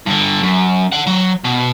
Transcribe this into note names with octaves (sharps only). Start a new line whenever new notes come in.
G2 D3
F#2
D5 F#5
F#3
B2